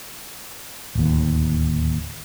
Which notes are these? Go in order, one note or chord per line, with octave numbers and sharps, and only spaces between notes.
D1 D#2